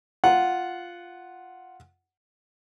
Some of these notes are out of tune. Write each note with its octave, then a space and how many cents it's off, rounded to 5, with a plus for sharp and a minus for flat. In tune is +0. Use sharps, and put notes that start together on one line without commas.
F4 +0 F#5 +0